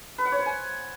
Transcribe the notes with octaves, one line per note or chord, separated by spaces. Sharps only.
B4
F#5
C#5
C5
G#5